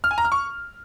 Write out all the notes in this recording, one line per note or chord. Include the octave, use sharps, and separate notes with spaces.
F6
G#5
A#5
F6
C#6